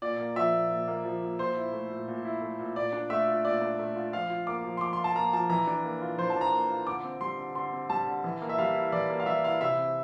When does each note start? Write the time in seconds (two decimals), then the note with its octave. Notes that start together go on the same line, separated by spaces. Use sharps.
0.02 A#2 D5
0.20 A#3
0.36 F3 E5
0.54 A#2
0.70 A#2
0.88 A#3
1.05 F3
1.22 A#2
1.39 A#2 C5
1.57 E4
1.73 A3
1.90 A#2
2.08 A#2
2.25 E4
2.42 A3
2.59 A#2
2.76 A#2 D5
2.93 D4
3.10 A3 E5
3.28 F4
3.44 A#2 D5
3.62 D4
3.79 A3
3.96 F4
4.13 F3 F5
4.30 F4
4.47 A#3 D6
4.64 F3
4.77 C6
4.81 F3 D6
4.93 C6
4.98 F4
5.04 A5
5.16 A#3 A#5
5.33 F3 A5
5.50 E3 A#5
5.67 D4
5.84 A#3
6.02 F4
6.18 E3 C5
6.30 A5
6.36 D4
6.41 A#5
6.52 A#3
6.70 F4
6.87 D3 D6
7.04 C4
7.21 G3 C6
7.38 D3
7.55 D3 C6
7.73 C4
7.90 G3 A5
8.07 D3
8.24 E3
8.42 A#3
8.49 E5
8.58 G3 F5
8.75 E4
8.92 E3 D5
9.10 A#3
9.20 F5
9.26 G3 E5
9.44 E4 F5
9.61 C3 E5
9.78 C4